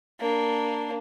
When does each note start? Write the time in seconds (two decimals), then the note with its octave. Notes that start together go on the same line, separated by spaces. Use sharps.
0.20 A#3 D4